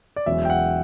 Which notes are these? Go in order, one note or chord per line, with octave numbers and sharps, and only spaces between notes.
D5
E1 E2 B2 F#3 C#4 E5
G5
F#5